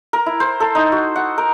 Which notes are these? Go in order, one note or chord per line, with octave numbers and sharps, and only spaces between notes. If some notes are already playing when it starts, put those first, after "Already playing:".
A#4
E4
C5
A4
D#4
F#4
F#5
A#4